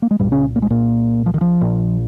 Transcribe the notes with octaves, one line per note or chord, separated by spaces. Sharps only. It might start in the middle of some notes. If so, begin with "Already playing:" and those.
A#3
G#3
C2 G2 A#2 G3
C#3 C#4
A#3
G#3
A#2 A#3
F3
D#3
F3
A#1 A#2